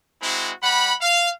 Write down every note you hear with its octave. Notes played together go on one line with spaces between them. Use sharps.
G#3 C4 E4 F#4
G3 F#5 B5
F5